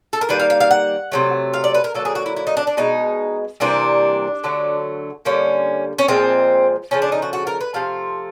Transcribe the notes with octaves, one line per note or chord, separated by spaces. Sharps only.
A4
A#4
D#3 G3 A#3 B4
F5
F5
F5
F#5
C3 D#3 F#3 A3
F5
D5
B4
A#4
D3 F#3 A#3 A4
G#4
F#4
E4
E4
D#4
D4
D4
B2 G#3 D#4
C3 E3 G3 A#3 D4
D3 F#3 A3
D3 G3 A#3 C#4
C#4
A#2 F3 G#3 C4
C#3 F3 A3 C#4
D4
D#4
F#4
F#4
A#4
B4
C3 F3 A3 F5